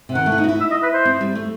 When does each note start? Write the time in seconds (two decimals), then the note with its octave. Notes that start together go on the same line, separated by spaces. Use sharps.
0.09 C3
0.15 D#3 F#5
0.26 A3
0.32 E4
0.38 D#4
0.44 F#4
0.49 E4
0.60 E5
0.71 D#5
0.83 B4
0.93 C5
1.05 C4
1.21 G3
1.35 A3